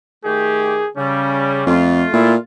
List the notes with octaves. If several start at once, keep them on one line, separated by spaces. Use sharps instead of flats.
D#3 A3 G4 G#4
C#3 G3 C#4
F2 A3 F4
A#2 E4